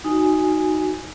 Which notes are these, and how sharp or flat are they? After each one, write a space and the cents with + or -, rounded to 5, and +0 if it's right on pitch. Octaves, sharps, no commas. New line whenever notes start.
D#4 +0 F#4 +0 G#5 +0